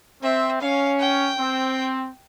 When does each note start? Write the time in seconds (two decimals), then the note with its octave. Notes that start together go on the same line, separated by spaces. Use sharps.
0.23 C4 E5
0.60 C#4 F5
1.00 G5
1.39 C4